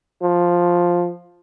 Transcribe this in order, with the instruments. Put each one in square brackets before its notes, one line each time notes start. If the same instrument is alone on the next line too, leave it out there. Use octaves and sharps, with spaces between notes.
[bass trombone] F3